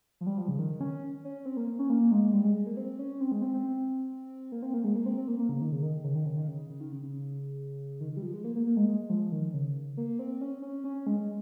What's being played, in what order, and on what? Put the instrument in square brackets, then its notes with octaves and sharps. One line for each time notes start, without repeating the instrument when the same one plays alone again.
[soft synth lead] F3
G3
F3
C#3
D#3
C#4
C#4
C4
A#3
C#4
A#3
G#3
G3
G#3
G#3
A#3
C4
C#4
C4
G#3
C4
C4
A#3
C4
A#3
G#3
A#3
C4
C4
A#3
A#3
C#3
D#3
C#3
D#3
C#3
D#3
C#3
D#3
C#3
C#3
D#3
C#3
C#3
D#3
D#3
G3
F3
G#3
A#3
A#3
A#3
G#3
G#3
F3
D#3
C#3
A#3
C4
C#4
C#4
C#4
G#3
G#3